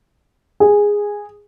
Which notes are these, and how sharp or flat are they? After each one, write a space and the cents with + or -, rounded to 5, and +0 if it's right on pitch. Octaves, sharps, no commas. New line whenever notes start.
G#4 -10